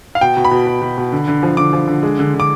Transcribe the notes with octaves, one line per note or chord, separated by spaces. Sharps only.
F5
B2 G5
B2
B5
B2
B2
B2
B2
D3
D3
F3
D3 D6
F3
D3
G#3
D3
D3
D6